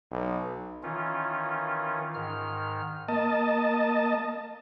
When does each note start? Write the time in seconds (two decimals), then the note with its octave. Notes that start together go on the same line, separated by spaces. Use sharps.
0.11 B1
0.83 D#3 E3 C#4 F4
2.14 G#2 D#3 F6
3.08 A#3 D#5 A5